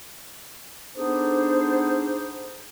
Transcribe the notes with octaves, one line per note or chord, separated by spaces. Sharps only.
B3 D4 D#4 G#4 A4 C5